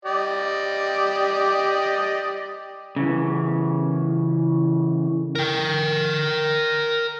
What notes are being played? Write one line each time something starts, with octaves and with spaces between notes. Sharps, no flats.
G4 D5 D#5
C#3 E3
A#4 G5